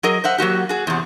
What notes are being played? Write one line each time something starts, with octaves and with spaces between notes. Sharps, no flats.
F#3 G#4 A#4 D#5
C5 E5 F#5
F#3 A#3 F#4 G4
F#4 G#4
E2 C3